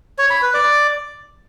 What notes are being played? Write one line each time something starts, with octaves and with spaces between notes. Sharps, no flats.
C#5
B5
B4
D5